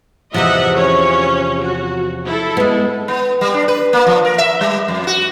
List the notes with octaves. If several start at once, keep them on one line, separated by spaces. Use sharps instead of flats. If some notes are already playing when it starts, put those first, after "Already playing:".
E2 C3 F3 D#5 E5 F#5
C#4 C#5
F#4
E4 A4
G#3 B3
B3
G3
D4
B4
A#3
F3
A#4
E5
G3
F2
F#4